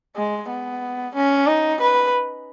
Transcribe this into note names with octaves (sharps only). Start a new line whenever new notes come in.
G#3
B3
C#4
D#4
B4